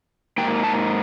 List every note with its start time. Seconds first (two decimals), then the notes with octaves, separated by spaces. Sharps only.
0.38 G#2 F3 A#3 G5
0.64 A5